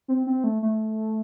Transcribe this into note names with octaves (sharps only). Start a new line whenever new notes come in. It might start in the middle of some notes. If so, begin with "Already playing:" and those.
C4
C4
A3
A3